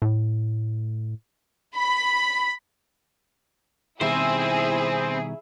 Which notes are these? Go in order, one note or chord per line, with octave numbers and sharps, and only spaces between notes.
A2
B5
B2 D#3 G3 C4 E4 G#4 C5 E5